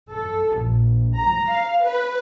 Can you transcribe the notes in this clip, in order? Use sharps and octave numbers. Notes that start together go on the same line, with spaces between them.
A4
A#1
A#5
F5
B4